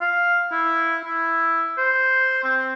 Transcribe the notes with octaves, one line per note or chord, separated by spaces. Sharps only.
F5
E4
E4
C5
C4